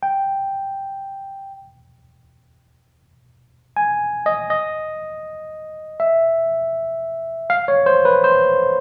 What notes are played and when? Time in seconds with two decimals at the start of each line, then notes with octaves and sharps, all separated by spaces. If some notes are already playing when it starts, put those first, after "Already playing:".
0.03 G5
3.77 G#5
4.26 D#5
4.50 D#5
6.00 E5
7.50 F5
7.68 C#5
7.86 C5
8.05 B4
8.24 C5